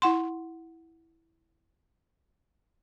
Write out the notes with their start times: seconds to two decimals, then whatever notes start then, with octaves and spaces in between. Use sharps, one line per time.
0.02 E4 F#5 C6